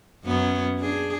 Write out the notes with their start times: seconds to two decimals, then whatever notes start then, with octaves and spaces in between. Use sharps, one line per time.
0.24 F#2 B3 C#4
0.79 D4 G#4